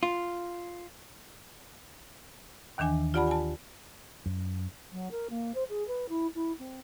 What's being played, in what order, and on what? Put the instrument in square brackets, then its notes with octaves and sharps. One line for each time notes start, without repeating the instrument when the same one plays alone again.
[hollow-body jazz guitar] F4
[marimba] D#2 D#3 E3 D4 G#5
F4 G4 D5 F#5 A5 B5
G#5 A5
[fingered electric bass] F#2
[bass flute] F#3
A#4
A#3
C5
G#4
B4
E4
E4
C4